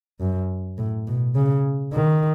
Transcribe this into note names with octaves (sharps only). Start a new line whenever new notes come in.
F#2
A2
B2
C#3
D#3